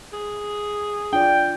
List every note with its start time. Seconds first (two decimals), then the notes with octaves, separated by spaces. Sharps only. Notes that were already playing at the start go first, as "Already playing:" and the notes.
0.13 G#4
1.13 D4 F4 D5 G5